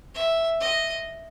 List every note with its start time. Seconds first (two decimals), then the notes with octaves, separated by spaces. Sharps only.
0.15 E5
0.60 D#5